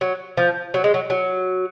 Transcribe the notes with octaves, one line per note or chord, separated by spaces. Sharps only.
F#3
F3
F#3
G#3
F#3
F#3